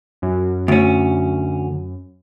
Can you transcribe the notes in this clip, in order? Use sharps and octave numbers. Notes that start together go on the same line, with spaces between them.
F#2
D2 C#4